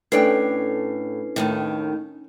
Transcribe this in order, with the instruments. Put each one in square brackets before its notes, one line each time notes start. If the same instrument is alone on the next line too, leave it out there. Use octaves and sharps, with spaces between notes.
[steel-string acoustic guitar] A2 [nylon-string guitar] C#4 D4 G5 [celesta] A4 B4 C7
[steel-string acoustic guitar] D#2 A2 D#3